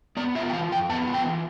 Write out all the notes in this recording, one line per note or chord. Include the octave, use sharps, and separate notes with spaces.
B3 D5
F4 E5
G5
E3 F5
F2 G5
B3 A5
F4
G5
E3